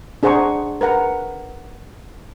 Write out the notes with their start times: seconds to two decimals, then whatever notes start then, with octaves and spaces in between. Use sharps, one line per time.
0.23 D4 G#4 C5 F#5 A#5 C#6
0.81 A#4 B4 F#5 A#5